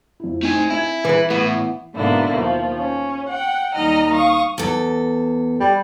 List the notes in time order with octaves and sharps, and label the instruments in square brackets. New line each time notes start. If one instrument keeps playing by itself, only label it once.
[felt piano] F2 E4
[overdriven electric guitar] A3 G#5 [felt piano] C4 D#4
[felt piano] C4 G#5 G#6 [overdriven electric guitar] E4
[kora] E3 B4
[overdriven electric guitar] A2 [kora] B3
[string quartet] G#2 B2 D3 A#3 E4
D#2 F3
C#4
F#5 G5
D#2 G3 D#4 D#5 A#5 F6
F5 C#6 D#6
[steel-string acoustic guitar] E2 A4
[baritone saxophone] G3